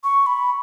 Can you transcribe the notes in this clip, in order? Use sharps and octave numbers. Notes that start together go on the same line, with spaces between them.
C#6
B5